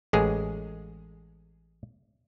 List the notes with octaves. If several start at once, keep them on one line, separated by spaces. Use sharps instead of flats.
A1 G#3 G#4